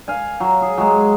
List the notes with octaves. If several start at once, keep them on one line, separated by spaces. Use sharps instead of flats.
F5 G#5
F#3
G#4
F#3 G#3